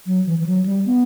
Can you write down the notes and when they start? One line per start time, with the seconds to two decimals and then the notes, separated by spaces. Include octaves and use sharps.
0.07 F#3
0.26 E3
0.39 E3
0.46 F#3
0.66 G3
0.86 B3